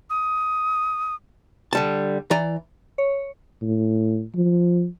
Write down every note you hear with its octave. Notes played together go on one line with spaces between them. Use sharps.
D#6
D3 G3 A5
E3 D5 A#5
C#5
A2
F3